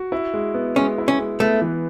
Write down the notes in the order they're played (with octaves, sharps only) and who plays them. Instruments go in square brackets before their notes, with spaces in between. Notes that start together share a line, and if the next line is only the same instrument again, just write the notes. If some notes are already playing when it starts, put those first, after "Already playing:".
Already playing: [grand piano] F#4
E4
G#3
B3
[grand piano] G#3 [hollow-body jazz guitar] C#4
[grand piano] E4
[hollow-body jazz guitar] C#4
[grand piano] G#3
[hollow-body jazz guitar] A3 [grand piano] B3
[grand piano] E3